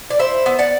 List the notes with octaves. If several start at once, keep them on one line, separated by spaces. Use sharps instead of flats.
D5
E4 C5 E5
B3
D5 F#5